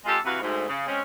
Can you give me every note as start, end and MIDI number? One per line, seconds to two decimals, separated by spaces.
0.05 0.18 56
0.05 0.18 60
0.05 0.18 65
0.05 0.18 67
0.05 0.18 69
0.25 0.38 48
0.25 0.38 52
0.25 0.38 66
0.25 0.38 71
0.25 0.38 77
0.41 0.66 38
0.41 0.66 44
0.68 0.86 49
0.87 1.00 56
0.87 1.00 60
0.87 1.00 61